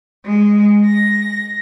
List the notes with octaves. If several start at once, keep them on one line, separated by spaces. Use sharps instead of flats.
G#3
A#6